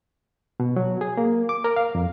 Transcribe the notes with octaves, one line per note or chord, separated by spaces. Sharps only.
B2
F#3
G#4
A#3
D6
A#4
F5
F2